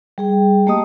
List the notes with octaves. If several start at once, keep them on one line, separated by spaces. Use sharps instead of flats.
G3 G#4 G5
A3 A#3 G4 D#5 D#6